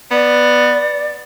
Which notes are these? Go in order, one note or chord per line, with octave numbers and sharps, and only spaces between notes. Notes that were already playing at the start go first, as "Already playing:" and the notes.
B3 D5